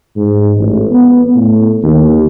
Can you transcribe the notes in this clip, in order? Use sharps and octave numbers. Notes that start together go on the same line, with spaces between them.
G#2
A1
B3
A2
D#2